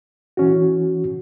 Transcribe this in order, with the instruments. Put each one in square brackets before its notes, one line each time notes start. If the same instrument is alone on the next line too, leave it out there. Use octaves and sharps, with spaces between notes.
[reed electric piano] E3 C#4 F#4